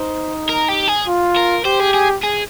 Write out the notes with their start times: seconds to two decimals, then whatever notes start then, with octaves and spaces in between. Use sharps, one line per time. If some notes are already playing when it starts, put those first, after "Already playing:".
Already playing: D#4 C5
0.49 A#4
0.69 G4
0.88 G#4
1.07 F4
1.36 A#4
1.65 G4 C5
1.80 G#4
1.94 G#4
2.23 G#4